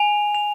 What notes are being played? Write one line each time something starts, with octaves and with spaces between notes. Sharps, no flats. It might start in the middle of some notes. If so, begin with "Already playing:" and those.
Already playing: G#5 F7
F7